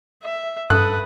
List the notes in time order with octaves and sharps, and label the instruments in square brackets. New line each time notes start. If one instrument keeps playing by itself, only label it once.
[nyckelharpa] E5
[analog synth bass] G2 [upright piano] A4 [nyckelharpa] B4 D#6 [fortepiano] F#6